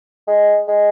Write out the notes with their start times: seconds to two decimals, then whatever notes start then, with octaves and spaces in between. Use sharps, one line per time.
0.27 G#3
0.68 G#3